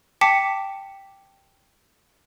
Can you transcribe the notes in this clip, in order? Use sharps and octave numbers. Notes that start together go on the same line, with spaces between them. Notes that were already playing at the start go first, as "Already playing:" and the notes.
G5 A5 D6 B6 C#7